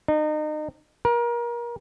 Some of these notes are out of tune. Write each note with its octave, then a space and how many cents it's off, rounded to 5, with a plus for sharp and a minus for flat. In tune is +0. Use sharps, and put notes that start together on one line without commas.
D#4 -30
A#4 +30